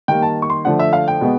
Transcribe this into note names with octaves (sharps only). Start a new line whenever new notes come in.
D#3 G3 A#3 G5
A5
C#6
C6
D3 F3 A3 D4 F#5
E5
F5
G5
B2 G#3 B3